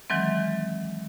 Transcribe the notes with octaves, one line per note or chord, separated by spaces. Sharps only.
D#3 E3 F#3 G#3 C4